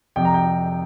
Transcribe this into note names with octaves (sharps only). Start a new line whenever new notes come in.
F1 F2 C3 G5
A#5
G5